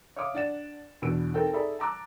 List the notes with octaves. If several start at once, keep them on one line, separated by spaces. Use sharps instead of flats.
C#5 E5 F5 D6 D#6
D4 D5 F#5 A6 E7
E2 B2 D4 E6 D7
C4 D#4 A4 A#4 G5
D#4 G#4 A4 D5 E5 B5
A5 A#5 D6 E6 F#6